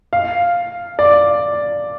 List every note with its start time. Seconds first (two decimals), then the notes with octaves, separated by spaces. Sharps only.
0.13 F5
0.99 D5